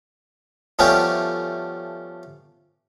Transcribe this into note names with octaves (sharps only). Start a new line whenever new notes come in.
F3 G3 A3 B3 C#4 G4